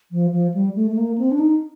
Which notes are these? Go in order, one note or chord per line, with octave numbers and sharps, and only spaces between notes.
F3
F3
G3
A3
A3
A#3
C4
D4
D#4